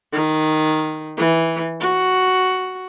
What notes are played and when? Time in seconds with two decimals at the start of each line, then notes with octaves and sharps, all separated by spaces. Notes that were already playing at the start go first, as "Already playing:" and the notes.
0.13 D#3
1.17 E3
1.80 F#4